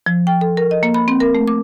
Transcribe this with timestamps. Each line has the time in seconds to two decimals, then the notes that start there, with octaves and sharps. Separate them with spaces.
0.06 F3
0.27 G5
0.41 A4
0.57 A#4
0.71 D#5
0.83 A#3
0.94 B5
1.08 C4
1.20 A#4
1.35 A3
1.48 D6